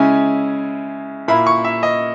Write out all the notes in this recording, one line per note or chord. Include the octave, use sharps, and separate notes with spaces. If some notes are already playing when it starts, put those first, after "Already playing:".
Already playing: C#3 G#3 C#4 E4 G#5
A#2 A#3 E4 B5
C#6
E5
D#5